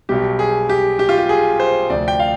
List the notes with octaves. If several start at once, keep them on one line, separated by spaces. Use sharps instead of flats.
B1 B2 G3 G4
G#4
G4
G4
F4
G4
G#4
C5
D2 C3 F3 D5
G5
F5